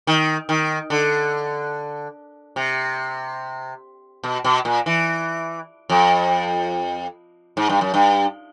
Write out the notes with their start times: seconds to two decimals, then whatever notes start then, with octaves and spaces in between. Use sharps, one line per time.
0.07 D#3
0.49 D#3
0.90 D3
2.56 C3
4.24 B2
4.44 B2
4.65 A#2
4.86 E3
5.90 F2
7.57 G#2
7.69 G2
7.81 F#2
7.94 G2